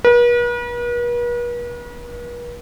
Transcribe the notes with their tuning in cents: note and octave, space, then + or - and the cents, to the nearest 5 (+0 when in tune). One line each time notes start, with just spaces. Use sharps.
B4 -45